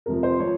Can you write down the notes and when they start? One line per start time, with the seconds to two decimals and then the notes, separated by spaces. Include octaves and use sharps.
0.06 F2 C3 F3 A#4
0.23 C5
0.40 F3 C#5